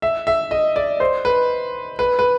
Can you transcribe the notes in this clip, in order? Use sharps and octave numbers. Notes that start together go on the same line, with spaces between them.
E5
E5
D#5
D5
C5
B4
B4
B4